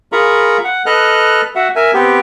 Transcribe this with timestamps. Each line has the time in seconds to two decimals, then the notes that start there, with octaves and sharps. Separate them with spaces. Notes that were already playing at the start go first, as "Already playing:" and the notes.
0.12 F4 G#4 A#4 A#5 B5 C#6
0.64 F#5
0.86 A4 B4 D#5 F6 F#6
1.55 F#4 E5 F#5
1.75 A#4 E5 G#5
1.94 B3 C4 G4